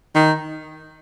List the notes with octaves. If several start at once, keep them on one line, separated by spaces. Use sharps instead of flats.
D#3